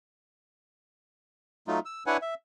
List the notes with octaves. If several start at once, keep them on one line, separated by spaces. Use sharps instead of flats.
F#3 A3 D#4 F4
E6
D4 E4 B4 C#5 F#5 G#5
E5